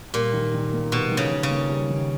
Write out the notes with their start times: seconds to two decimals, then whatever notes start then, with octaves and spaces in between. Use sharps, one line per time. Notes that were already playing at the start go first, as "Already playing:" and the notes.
0.13 A#2 G3
0.33 D#3
0.54 D#3
0.73 A#3
0.92 B2 G3
1.11 D#3
1.17 C#3
1.31 D#3
1.43 C#3
1.50 A#3
1.69 G3
1.90 D#3